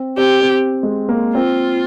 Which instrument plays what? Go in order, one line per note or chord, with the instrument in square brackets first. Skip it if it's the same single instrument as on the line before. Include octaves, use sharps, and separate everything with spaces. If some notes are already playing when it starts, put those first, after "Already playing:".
Already playing: [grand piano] C4
[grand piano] C4 [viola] G4
[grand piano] C4
G#3
A#3
[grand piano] C4 [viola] F4